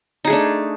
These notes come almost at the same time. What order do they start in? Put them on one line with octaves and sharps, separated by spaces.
D#4 G#4 A3 D4